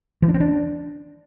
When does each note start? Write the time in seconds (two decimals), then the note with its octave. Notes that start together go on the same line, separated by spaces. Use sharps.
0.22 E3
0.28 D4
0.34 C4
0.40 D4